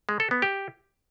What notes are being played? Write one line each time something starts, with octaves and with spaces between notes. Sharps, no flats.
G#3
A4
B3
G4